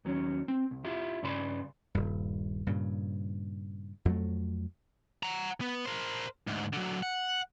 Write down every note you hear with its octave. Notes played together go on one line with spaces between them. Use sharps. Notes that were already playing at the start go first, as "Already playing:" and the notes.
D#2 F#3 C#4
C4
C2
E4 F4 G4 E5
G2 C#3 D5 G#5 B5 C6
D#1 G2
G2 A#2 C#3
F2 F#3 A3
F#5 A#5
B3
A#4 C5
D2 G#2
D3 F#3
F#5